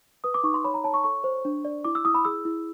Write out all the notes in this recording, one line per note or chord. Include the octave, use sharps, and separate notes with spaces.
B4 D#6
D6
D#4 C#6
C6
C#5 B5
A#5
C#5 A5
C#6
A4 C#6
C5
D4
D5
E4 D6
E6
E4 D#6
B5
G#4 E6
E4